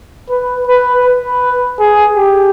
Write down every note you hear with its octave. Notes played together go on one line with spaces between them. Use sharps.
B4
B4
B4
G#4
G4